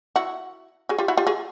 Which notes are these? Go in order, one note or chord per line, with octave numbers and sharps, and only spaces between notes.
E4 F#4
F#4 G#4
F4 G4
E4 F#4
F4 G4
F#4 G#4